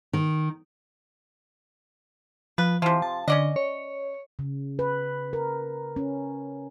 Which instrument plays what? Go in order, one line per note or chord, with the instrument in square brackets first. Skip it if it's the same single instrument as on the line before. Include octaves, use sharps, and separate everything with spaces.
[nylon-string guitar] D#3
[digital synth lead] F3 [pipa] B4
[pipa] C3 F3 [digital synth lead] E3
[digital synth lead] A5
[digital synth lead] D3 [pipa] C#4 D5 D#5
[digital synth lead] C#5
[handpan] C#3
B4
A#4
C#4